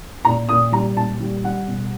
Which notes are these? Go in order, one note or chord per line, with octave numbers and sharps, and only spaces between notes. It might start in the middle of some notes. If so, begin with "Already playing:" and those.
A#2 A#5
A#2 D#6
G3 A#5
A#2 A5
G3
G3 F#5
B2